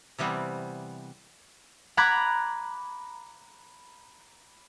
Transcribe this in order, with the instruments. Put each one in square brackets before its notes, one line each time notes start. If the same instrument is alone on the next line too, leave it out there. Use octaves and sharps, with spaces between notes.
[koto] C3 E3 G3 B3 C4
[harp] A#5 B5 D6 F#6 G#6